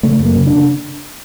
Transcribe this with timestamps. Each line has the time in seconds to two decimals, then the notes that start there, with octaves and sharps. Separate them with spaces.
0.03 C#3 A3
0.20 F#2
0.25 A#3
0.36 C#3
0.47 D4
0.53 C#3